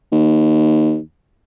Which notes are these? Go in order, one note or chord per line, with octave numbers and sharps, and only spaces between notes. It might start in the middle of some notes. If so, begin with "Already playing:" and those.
D#2